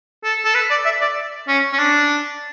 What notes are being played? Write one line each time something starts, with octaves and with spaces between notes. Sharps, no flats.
A4
A4
B4
D5
E5
D5
C#4
C#4
D4